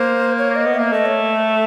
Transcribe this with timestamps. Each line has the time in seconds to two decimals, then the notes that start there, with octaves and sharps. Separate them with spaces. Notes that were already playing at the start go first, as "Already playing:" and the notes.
Already playing: A#3 C5
0.38 C#5
0.56 D#5
0.66 B3
0.74 A#3 E5
0.92 A3 D#5
1.05 C#5